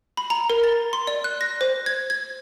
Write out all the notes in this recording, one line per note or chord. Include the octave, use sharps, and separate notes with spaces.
B5
A#5
A#4
A6
C6
D5
F#6
A#6
C5
G#6
G#6